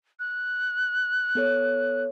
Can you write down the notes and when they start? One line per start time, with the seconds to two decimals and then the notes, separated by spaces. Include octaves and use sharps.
0.19 F#6
1.35 B3 A4 C#5